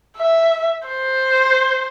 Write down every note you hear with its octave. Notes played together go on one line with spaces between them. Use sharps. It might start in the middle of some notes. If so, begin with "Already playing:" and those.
E5
C5